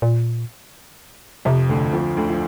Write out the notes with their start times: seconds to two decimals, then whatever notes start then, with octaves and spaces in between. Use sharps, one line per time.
0.02 A#2
1.45 F2 C3 F3
1.69 D2 D3
1.93 F2 F3
2.17 D2 D3
2.30 F3